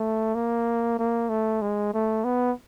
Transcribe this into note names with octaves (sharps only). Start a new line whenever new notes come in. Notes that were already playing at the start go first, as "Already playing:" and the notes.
Already playing: A3
A#3
A#3
A3
G#3
A3
B3